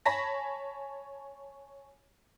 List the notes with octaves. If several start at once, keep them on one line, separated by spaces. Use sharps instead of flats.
C#5 G#5 A5 B5 A#6 B6